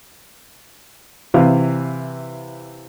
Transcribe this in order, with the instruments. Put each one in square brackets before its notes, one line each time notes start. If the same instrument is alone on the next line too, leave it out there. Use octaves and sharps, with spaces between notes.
[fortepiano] C3 E3 F5